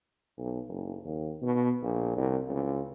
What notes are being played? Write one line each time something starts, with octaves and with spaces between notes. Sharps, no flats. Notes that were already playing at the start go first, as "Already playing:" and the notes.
B1
F#1
D#2
B2
A#1
C2
C#2